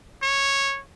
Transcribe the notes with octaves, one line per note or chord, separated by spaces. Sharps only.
C#5